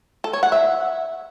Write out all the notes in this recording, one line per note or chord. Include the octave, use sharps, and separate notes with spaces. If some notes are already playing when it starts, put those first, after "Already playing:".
A4
C#5
F#5
E5